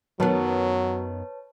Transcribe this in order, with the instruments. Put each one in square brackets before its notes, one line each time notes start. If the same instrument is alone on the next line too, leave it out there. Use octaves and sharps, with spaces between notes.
[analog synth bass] F#2 [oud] D#3 B3 [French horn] F#3 [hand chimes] B4 C#5 A5